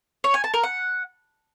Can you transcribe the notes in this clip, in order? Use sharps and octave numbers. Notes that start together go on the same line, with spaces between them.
C#5
G#5
A5
A#4
F#5